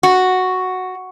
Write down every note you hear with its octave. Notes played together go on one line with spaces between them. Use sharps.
F#4